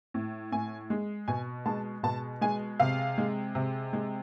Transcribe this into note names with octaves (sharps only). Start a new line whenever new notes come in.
A2
A2 G#5
G#3
B2 G#5
G#3 A5
B2 A5
G#3 G#5
C3 F5
G#3
C3
G#3